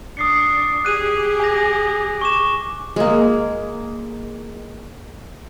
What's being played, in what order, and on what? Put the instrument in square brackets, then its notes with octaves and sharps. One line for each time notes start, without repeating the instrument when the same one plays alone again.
[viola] D4 [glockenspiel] D#6 C7 C#7
[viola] G4 G#4 [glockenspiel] F#6 D#7
[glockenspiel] G#5 A#6
C#6 D6 E7
[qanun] G#3 A#3